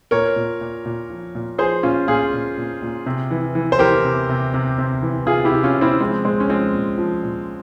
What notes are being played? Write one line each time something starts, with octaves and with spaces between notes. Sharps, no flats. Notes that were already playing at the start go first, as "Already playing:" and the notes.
A#2 A#4 C#5
A#2
A#2
A#2
F3
A#2
F3 G#4 C5
A#2 C#4 F4
A#2 F4 G#4
A#2
A#2
A#2
C3
E3
E3
C5
E3 G4 A#4
C3
C3
C3
C3
E3
C3 F4 G#4
E4 G4
C3
C#4 F4
C3
C4 E4
F3 G#3 C4
A#2 G#3 C4
C#4
F3 G#3 C4
A#2
F3
A#2